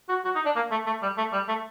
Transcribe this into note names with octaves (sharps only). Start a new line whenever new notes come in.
F#4
F#4
D#4
D4
A#3
A3
A3
G3
A3
G3
A3